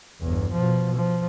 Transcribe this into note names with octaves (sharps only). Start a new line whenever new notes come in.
G1 E2
B2 F3
F3